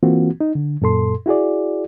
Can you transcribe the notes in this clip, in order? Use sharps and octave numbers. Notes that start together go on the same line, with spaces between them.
E3 A#3 C4 F4 F#4
D#4
D3
F#2 A#2 A4 C6
E4 F#4 G#4 D5